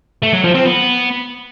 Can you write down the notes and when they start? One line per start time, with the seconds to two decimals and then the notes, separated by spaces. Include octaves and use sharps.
0.22 A3
0.33 F#3
0.44 F3
0.54 C4
0.65 B3